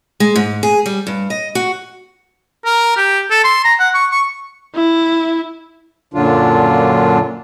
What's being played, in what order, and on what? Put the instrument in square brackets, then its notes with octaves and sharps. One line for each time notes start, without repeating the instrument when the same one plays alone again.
[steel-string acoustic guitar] G#3
G#2
G#4
G3
G2
D#5
F#4
[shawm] A#4
G4
A4
C6
A#5
F#5
C#6
C#6
[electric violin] E4
[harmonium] F#2 A#2 D3 F#3 D4 F4